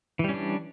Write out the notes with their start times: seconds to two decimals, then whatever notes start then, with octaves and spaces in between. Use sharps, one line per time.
0.19 E3
0.24 G3
0.29 C#4
0.34 D4